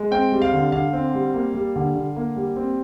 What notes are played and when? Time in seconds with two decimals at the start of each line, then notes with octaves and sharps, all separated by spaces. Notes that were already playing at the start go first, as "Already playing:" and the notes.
Already playing: G#3
0.11 C4 G5
0.32 G3
0.42 F5
0.53 D3
0.72 D3 F5
0.93 C4
1.14 G3
1.34 A#3
1.54 G3
1.76 D3
1.95 D3
2.16 A#3
2.36 G3
2.56 C4